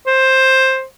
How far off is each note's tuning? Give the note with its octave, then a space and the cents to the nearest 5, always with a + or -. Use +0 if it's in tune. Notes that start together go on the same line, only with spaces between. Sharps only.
C5 +10